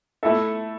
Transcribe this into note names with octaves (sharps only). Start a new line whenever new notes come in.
A3 E4 A4 E5